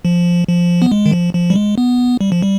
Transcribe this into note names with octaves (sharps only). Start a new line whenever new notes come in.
F3
F3
B3
G#3
D#3
F3
F3
G3
G#3
B3
G3
F3
G3